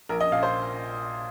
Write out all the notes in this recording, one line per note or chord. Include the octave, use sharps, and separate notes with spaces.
A#1 A#4
D#5
A#2 F5
C5